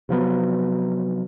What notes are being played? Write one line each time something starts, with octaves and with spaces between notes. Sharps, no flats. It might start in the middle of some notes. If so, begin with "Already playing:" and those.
C3 F3 F#3 B3